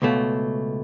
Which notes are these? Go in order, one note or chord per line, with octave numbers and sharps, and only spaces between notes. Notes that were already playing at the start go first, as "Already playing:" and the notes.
C#2 B2 A3